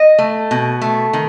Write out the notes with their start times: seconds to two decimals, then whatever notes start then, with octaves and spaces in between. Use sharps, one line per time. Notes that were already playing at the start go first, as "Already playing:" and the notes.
Already playing: D#5
0.19 A3
0.51 B2
0.82 A3
1.13 D#3